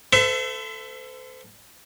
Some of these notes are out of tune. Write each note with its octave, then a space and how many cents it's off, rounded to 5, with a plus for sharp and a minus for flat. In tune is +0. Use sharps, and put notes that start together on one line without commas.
A4 +5 C5 -40 E5 +20